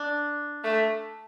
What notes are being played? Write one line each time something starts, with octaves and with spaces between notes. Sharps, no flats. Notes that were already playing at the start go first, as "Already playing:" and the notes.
Already playing: D4
A3